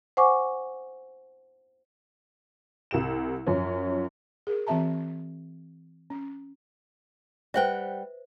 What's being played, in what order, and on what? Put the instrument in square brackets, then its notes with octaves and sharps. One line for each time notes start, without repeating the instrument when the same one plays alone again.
[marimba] C5 F#5 G#5 C#6 D6
[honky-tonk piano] C2 G4 E7
F#2 F3 C#4
[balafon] G#4 A#4
E3 C4 F#4 E5 A5 A#5
C#4
[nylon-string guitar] G3 F#5 G5 [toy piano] B4 C5 E5